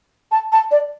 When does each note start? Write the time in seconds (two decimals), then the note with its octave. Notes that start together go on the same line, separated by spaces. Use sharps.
0.32 A5
0.52 A5
0.71 D5